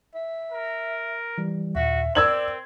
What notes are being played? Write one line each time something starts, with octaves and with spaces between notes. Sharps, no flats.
E5
A#4
E3 G3
D#2 A#2 F#4 E5
C4 A#4 D5 E6 G#6 F#7